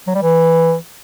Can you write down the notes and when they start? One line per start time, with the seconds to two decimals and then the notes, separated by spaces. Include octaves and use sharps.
0.07 F#3
0.15 G3
0.22 E3